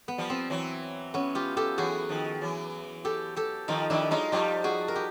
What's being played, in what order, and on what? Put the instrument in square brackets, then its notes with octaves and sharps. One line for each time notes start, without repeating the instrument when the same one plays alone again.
[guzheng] B3
[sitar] F3 G3
[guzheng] C4
[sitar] E3 F#3
[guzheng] B3 C#4
F4 G4
G4 A4
[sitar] E3 F#3 [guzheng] F#4 G#4
[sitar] D#3 F3
E3 F#3
[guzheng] G4 A4
G4 A4
[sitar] D#3 F3 [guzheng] D#4 F4
[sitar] D#3 F3 [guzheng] D4 E4
[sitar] F#3 G#3 [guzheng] D#4 F4
[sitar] F3 G3 [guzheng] F4 G4
[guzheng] F#4 G#4
A#4
G4